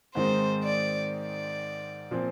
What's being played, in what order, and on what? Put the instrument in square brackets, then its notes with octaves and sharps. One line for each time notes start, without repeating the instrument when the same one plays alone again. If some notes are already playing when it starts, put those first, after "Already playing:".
[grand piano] G#2 D#3 G#3 C4 D#4 [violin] C5
[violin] D5
D5
[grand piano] A#2 F3 C4